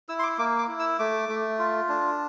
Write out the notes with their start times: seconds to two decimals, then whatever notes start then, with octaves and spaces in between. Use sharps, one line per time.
0.09 E4 E6
0.19 C6
0.23 D6
0.38 A#3 D6
0.59 D6
0.68 E4
0.79 E6
0.99 A3 D6
1.29 A3
1.59 F4
1.89 D4